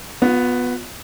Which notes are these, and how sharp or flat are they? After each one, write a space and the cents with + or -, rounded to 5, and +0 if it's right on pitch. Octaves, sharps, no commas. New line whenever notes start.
B3 +0 F4 +40